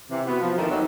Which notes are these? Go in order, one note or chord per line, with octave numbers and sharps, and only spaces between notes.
C3 E3
B3 F#4
F3
D#2 D#3 A3 D#4 E4
D#2 D#3 F#3 C4 D#4 E4